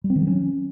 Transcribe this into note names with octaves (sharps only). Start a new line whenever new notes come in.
G3
C4
D#3
F#3
C#4